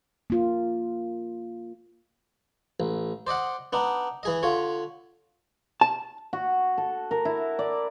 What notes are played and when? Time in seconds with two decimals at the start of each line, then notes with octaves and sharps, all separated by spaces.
0.30 A#3 F4
2.80 A1
3.27 C5 D5 D#5 F#5
3.73 B3 D4 D#4
4.23 E3 G#4 D#5
4.43 D3 F4 C#5
5.81 A5
6.33 F#4
6.78 A4
7.11 A#4
7.25 E4
7.59 D5